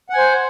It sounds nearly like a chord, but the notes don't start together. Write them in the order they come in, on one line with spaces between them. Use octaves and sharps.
F#5 G#5 C5